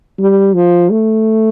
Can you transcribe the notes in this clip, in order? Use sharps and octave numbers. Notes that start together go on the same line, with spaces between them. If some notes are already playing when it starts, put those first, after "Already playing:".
G3
F3
A3